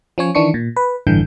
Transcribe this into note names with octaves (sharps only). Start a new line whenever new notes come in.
F3 C#4 C#5
D#3 E3 D4 C#6 C#7
A#2
B4
A1 G2 D3 E3 G6